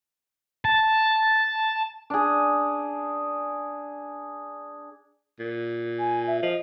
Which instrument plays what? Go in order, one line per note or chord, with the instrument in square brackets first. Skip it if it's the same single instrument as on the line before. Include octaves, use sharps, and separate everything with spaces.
[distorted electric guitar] A5
[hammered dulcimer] D4 G#4
[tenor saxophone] A#2
[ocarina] G#5
E5
[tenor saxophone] F3 [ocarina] D#5